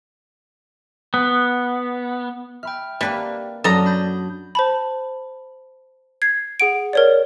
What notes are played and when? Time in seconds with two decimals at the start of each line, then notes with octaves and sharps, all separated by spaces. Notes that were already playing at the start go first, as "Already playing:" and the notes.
1.14 B3
2.63 E5 G5 B5 F6
3.01 G3 A#3 D4 B4
3.64 F#2 F#3 A4 D5 A5 A#5 D#6
3.85 D4 B5 G6
4.55 C5 A5 B5
6.22 G#6 C7
6.60 G#4 F#5 D7
6.93 A#4 C#5 D5